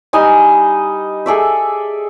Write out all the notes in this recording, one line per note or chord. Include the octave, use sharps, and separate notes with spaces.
G3 D#4 D#5 G#5
G#4 A4 D5 E5